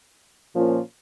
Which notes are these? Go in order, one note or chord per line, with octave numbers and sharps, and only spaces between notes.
A#2 F3 A#3 C#4 F4